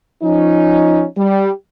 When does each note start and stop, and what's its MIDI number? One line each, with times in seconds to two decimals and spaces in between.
0.23 1.04 53
0.23 1.04 61
0.23 1.04 63
1.17 1.50 55